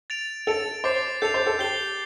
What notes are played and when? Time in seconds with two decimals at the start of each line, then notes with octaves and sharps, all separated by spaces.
0.10 A6 D7 F7
0.47 A4 A6 D7 F7
0.84 C5 D6 A6 C7
1.22 A4 G6 C7 F7
1.34 C5
1.47 A4
1.59 G4 G6 C7 G7